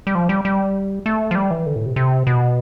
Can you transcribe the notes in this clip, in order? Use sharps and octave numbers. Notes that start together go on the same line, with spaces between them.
G3
F3
G3
G3
A3
F3
G3
E3
D3
A2
C3
C3
B2